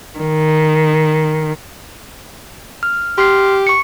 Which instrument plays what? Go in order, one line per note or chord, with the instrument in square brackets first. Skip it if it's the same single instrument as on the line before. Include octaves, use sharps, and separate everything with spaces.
[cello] D#3
[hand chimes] F6
[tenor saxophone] G4 [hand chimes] C6 F6 C7
[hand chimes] C#6 C#7